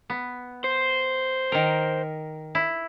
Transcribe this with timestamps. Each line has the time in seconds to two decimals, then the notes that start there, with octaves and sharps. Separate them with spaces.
0.10 B3
0.64 C5
1.52 D#3 A#4
2.55 E4